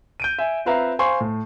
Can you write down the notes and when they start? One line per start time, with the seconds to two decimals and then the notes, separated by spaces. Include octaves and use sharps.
0.20 G6 D7 D#7
0.39 E5 G#5
0.65 C4 F4 B4 E5 F5 A#5
0.99 C5 F5 G#5 C6 C#6
1.21 A2